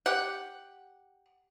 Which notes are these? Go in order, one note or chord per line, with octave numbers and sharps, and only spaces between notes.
G4 F#5